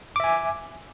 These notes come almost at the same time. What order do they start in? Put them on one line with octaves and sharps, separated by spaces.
D6 E5 G#5